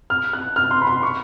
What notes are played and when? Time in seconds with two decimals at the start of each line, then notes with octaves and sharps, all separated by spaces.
0.10 F6
0.33 F#6
0.56 F6
0.71 C6
0.82 B5
0.87 C6
1.03 C#6